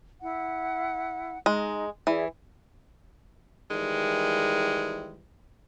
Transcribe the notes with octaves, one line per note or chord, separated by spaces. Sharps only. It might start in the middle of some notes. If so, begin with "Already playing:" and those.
E4 F#5
G#3 D#4
E3 G#4 D5 E5
D#3 E3 G3 G#3